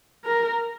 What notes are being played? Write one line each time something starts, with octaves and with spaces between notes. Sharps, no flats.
A#4